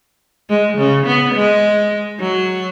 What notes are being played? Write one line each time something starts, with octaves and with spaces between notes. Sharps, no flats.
G#3
C#3
B3
G#3
F#3